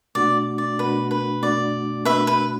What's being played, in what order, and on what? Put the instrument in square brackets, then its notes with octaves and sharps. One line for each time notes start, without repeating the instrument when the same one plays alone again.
[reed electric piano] B2 A3 D4 F#4 [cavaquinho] D5
[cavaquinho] D5
[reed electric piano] B2 A3 D4 F#4 [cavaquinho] B4
[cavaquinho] B4
[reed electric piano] B2 A3 D4 F#4 [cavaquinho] D5
[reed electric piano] B2 A3 D4 F#4 [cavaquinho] B4 E5
[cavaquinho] B4